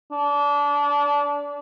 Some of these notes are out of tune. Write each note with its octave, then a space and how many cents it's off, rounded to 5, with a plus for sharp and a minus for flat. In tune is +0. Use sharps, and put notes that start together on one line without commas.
D4 -25